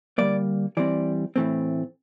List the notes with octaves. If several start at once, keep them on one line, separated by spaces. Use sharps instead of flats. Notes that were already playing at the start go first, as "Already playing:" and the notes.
D3 G3 A#3 D5
E3 G3 C4 D5
A2 E3 A3 C4